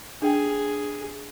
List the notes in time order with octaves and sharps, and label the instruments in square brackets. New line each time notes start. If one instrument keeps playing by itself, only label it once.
[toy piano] D4 G5 [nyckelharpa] G#4